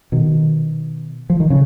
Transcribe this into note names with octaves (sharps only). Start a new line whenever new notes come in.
B2 D#3
F3
D#3
C#3